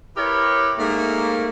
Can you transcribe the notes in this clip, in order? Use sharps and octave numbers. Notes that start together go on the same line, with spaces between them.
E4 G4 A#4 B4 C#5
G#2 A3 A#3